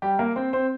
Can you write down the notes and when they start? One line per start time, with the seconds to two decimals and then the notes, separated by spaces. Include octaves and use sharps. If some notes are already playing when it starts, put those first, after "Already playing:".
0.02 G3 G4
0.19 A#3 A#4
0.36 C4 C5
0.53 C4 C5